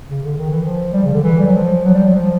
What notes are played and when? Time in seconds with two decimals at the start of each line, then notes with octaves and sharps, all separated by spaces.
0.09 C#3
0.23 D3
0.37 D#3
0.50 E3
0.64 F3
0.93 G3
1.04 C#3
1.14 D3
1.24 E3
1.39 G3
1.46 F#3
1.54 F3
1.84 F#3
1.94 G3
2.04 F#3
2.14 F3